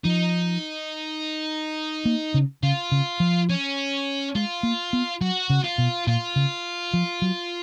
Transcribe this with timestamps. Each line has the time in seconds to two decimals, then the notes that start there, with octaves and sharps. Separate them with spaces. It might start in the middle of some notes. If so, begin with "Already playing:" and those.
0.04 F3 D#4
2.05 A#3
2.34 C#3
2.63 C#3 F4
2.92 C#3
3.20 F3
3.50 C#4
4.35 G#3 F4
4.63 A#3
4.93 B3
5.21 F#3 F#4
5.50 C#3
5.64 F4
5.78 B2
6.07 A#2 F4
6.36 C#3
6.94 F3
7.22 F#3